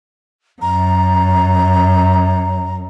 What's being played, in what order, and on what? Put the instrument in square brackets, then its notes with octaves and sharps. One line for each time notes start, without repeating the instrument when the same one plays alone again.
[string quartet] F#2 [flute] A#5